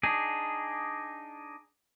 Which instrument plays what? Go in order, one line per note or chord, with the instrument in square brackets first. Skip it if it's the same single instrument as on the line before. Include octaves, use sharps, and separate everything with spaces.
[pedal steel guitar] D4 D#4 G#4